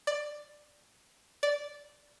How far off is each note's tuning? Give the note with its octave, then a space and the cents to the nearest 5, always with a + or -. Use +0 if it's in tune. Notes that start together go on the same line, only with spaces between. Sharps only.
D5 +10
D5 -10